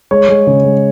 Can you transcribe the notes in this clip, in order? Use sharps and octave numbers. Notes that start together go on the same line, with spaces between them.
G#3 C#5
G#3
C#3
G#3